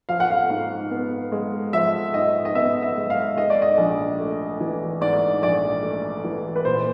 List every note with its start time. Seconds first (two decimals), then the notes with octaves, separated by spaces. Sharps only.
0.09 F3 F5
0.20 F#5
0.30 F5
0.50 G#2
0.91 B3
1.32 G#3
1.73 F3 E5
2.14 G#2 D#5
2.45 D#5
2.55 B3 E5
2.83 E5
2.96 G#3
3.10 F5
3.37 G#2 D#5
3.50 D5
3.62 D#5
3.78 A#1
4.20 A3
4.61 E3
5.01 G#2 D5
5.42 A#1 D5
5.83 A3
6.24 E3
6.56 B4
6.65 A#2 C5